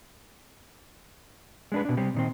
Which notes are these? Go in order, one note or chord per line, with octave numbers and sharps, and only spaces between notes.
G#3 D4 B4
B2 D4
C3 G3 C4
A#2 D#3 C4